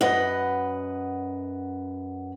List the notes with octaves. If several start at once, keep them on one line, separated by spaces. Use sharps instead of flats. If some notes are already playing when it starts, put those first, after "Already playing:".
F#2 B4 D#5 F#5